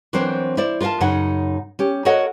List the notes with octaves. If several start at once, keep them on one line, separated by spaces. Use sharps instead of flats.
E3 F#3 C4 D4 A#4 C5
E4 C5 D5
F4 A#4 C5 F5 A5
F#2 C#3 D#4 F#5
C#4 G4
F#4 A4 A#4 C#5 D#5 F#5